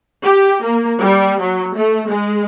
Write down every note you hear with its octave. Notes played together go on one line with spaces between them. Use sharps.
G4
A#3
G3
F#3
A3
G#3